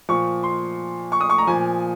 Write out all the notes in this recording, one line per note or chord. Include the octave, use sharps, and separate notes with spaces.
A#2 F3 C#6
C6
C#6
D#6
C#6
A#5
A#2 F3 G#5